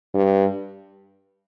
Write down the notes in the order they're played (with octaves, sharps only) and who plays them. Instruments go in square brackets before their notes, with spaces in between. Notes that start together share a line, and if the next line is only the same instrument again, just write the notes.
[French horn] G2